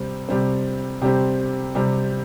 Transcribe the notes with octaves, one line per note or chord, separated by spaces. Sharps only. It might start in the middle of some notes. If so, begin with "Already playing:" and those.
Already playing: C3 G3 C4
C3 G3 C4
C3 G3 C4 G4
C3 G3 C4